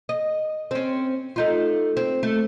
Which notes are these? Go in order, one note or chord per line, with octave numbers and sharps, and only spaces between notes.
D#5
C4 C#4
A3 D#4 F4
C4
A3